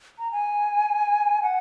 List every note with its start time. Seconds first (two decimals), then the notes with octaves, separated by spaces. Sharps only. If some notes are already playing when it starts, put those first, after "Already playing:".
0.19 A#5
0.32 G#5
1.42 F#5